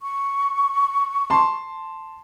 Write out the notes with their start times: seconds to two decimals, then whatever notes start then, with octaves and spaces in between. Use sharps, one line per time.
0.02 C#6
1.30 A5 C6